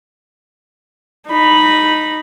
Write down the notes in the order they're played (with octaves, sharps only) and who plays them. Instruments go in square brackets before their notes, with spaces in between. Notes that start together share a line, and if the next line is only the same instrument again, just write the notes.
[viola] D#4 B5